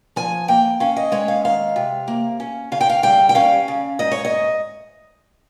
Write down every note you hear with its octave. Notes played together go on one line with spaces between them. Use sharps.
F3 G#5
A#3 G5
C#4 F5
D#5
G#3 C#5
F5
D#3 F5
C3
A#3
C#4
C#3 F5
G5
F5
G3 G5
G5
C#4 F5
C#3
G#2 D#5
C#5
D#5